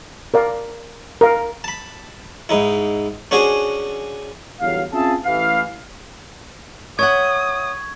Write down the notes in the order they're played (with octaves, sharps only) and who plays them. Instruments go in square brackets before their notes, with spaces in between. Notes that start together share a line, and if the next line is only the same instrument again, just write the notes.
[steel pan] A#4 D5 F5
A#4 F5
[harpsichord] A5 B5
G#2 D#4 E4
C#4 D4 F#4 G#4 C5 G#5
[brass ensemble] G1 E2 F#3 F5
C4 C#4 F4 G#4 E5 A5
A1 E3 F5
[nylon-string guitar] C#5 E5 F#5 [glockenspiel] C#6 G#6 [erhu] D#6